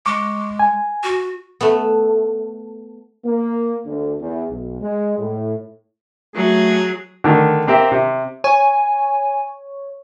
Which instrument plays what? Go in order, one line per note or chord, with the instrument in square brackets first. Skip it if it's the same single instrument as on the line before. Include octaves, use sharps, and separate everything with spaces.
[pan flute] G#3 [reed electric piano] C#6 D6
[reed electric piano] G#5
[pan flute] F#4
[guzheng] A3 B3
[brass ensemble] A#3
D2
E2
B1
G#3
A2
[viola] F#3 [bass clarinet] A3 [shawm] G#4
[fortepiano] D3 D#3 A3
A#3 C4 G4 E5
C3
[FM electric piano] C#5 [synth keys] G#5